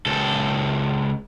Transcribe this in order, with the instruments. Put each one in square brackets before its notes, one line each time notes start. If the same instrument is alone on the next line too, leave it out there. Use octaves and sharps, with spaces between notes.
[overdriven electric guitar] C#2 A4